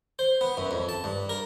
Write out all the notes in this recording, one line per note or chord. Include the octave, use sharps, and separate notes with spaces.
C5
B3
F#2
F2
A5
G2
A#4